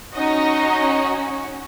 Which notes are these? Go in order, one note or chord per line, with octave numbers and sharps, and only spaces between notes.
C#4 D#4 F#4 D#5